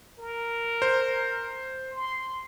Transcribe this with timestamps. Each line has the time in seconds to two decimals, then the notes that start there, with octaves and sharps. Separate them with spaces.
0.19 A#4
0.82 C5
1.92 C6